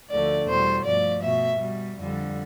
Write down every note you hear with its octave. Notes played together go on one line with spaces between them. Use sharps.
D2 D3 F3 A3 D5
E2 B2 G3 C5
G2 F3 A3 D5
B2 A3 E5
B2 G3
F2 D3 G3